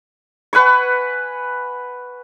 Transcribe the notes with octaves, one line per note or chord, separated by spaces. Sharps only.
B4 F#5 G#5 C#6